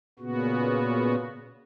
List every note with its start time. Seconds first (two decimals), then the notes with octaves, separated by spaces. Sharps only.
0.19 A#2 C#3 B3 F#4